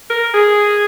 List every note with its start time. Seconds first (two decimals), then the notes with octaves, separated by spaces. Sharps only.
0.10 A#4
0.34 G#4